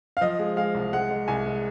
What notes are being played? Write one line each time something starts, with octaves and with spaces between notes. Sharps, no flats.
F5
F3 D#5
G#3
G#3 F5
C2
G#3 F#5
G#3
C2 G#5
G#3